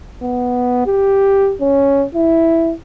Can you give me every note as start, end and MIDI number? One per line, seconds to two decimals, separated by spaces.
0.22 0.83 59
0.86 1.55 67
1.61 2.05 61
2.14 2.73 64